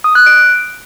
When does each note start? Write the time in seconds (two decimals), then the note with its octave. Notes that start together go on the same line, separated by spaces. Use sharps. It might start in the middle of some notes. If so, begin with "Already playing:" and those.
0.04 D#6
0.15 F#6
0.26 D7